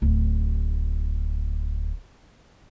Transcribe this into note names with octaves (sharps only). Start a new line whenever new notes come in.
D1 D2